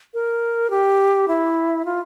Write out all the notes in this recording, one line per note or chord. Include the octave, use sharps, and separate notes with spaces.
A#4
G4
E4
F4